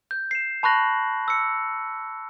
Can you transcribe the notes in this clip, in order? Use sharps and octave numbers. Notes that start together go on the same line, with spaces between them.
G6
C7 E7
A5 B5 C#6 F#6 A#6 F#7
E6 C#7